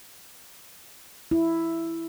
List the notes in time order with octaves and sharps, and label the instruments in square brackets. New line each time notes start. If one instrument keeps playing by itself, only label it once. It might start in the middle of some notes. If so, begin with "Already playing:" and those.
[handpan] E4